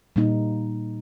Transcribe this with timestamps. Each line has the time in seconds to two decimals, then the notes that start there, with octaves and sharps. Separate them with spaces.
0.16 A#2 G3 A#3 D#4